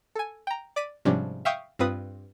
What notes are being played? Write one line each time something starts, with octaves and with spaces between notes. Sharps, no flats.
A4 G#5
G5 A#5
D5 D6 B6 D#7
G#2 C3 F3 G3 C#4 D4
E5 F5 G5 C#6 D#6 G6
G2 C4 F4 B4 D#6